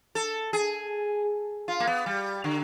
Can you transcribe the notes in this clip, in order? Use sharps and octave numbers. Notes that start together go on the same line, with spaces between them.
A4
G#4
F4
A#3
B3
G3
D3